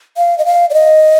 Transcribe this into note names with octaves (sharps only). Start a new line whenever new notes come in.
F5
D#5
F5
D5
D#5